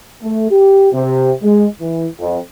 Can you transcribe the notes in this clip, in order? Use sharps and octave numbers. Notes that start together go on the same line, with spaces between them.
A3
G4
C3
G#3
E3
F2